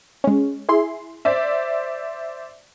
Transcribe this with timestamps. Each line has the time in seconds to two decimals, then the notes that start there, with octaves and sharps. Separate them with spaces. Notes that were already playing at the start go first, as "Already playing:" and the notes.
0.24 G#3 C#4
0.69 E4 G#4 C6
1.25 C5 D5 E5